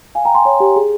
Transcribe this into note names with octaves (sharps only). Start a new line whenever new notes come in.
F5 G#5
G5 A#5
G#5 C6
C#5
G4
G#4